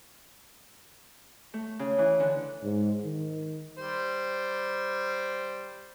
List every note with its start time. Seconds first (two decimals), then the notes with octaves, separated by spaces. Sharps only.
1.54 A3
1.79 C#3
1.98 E3
2.20 D3
2.63 G#2
3.04 D#3
3.77 G3 C5